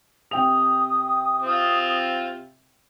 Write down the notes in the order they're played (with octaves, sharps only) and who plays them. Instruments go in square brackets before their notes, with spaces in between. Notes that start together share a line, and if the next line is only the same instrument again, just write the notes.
[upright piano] C3 G5 F7 [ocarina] D#6
[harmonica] C4 F4